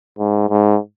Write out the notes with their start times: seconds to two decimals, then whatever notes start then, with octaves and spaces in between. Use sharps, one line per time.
0.19 G#2
0.49 G#2